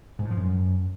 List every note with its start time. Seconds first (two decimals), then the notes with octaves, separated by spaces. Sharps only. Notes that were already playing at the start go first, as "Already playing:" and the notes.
0.19 G#2
0.25 A2
0.31 F3
0.37 F#2